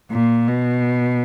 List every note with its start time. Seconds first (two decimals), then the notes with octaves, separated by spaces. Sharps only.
0.11 A#2
0.48 B2